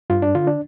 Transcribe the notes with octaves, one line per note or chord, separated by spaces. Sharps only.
G2 F4
D4
D3 F4
D4